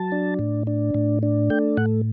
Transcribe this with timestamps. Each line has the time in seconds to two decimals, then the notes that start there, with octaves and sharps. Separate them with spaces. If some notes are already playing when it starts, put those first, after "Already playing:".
Already playing: F#3 A5
0.12 D4
0.39 A2
0.67 D4
0.94 A2
1.23 D4
1.50 A3 G5
1.77 A2 F#5